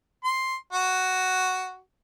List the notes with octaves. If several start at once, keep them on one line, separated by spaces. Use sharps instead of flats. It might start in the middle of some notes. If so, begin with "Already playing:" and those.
C6
F#4